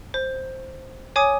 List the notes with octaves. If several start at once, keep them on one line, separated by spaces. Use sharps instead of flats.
C5
C#5 G#5 D6 D#6